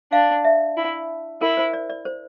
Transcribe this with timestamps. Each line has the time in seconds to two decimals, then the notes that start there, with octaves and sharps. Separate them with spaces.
0.12 D4 F5
0.44 E5
0.77 E4
1.41 E4 A#4
1.57 C5
1.73 D5
1.89 D5
2.05 C5